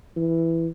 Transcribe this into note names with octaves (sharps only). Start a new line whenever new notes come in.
E3